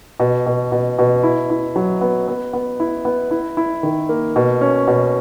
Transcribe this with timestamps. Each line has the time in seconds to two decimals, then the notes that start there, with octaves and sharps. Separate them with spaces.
0.20 B2
0.46 B2
0.72 B2
0.98 B2
1.23 E4
1.50 E4
1.76 F#3
2.01 B3
2.28 B3
2.53 B3
2.80 E4
3.05 B3
3.31 E4
3.57 E4
3.83 D#3
4.09 A#3
4.36 B2
4.61 C#4
4.87 B2